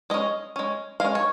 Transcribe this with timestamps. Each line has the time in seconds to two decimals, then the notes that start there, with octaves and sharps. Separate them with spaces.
0.10 G#3 C#4 D#5
0.56 G#3 C#4
1.00 G#3 C#4 F5
1.15 C#5